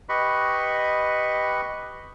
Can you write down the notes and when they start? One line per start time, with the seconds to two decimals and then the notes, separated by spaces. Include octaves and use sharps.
0.09 G4 B4 D#5 B5 C#6